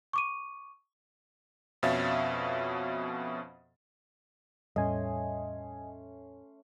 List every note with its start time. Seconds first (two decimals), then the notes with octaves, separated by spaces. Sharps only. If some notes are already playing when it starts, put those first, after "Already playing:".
0.13 C#6 D6 D#7
1.83 F2 B2 C#4 E5 F5 A6
4.76 E2 A2 G3 A3 C#4 D#5 G#5 C6